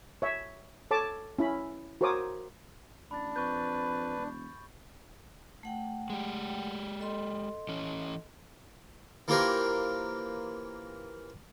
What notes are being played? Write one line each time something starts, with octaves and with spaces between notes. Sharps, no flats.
C#5 E5
A4 C#5 A5 D6
C#4 E4 B5
F#4 A#4 C5 C#5 D6 D#6
A1 D4 B5 A6
F2 B4 C#6 G6
E1
A3 F#5 G5
G#3 G4
A4 D#5 C6
E3 C#4
E3 A#3 F4 G4 A#4 C5